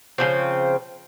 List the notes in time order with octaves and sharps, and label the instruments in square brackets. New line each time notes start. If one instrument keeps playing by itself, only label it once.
[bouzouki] C#3 F3 C4